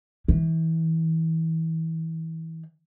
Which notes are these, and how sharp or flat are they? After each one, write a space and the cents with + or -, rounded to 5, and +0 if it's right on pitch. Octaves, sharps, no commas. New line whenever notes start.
E3 -30